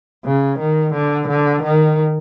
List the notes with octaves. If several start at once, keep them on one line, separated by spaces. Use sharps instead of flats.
C#3
D#3
D3
D3
D#3